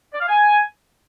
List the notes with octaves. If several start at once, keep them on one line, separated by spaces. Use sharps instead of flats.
D5
F5
G#5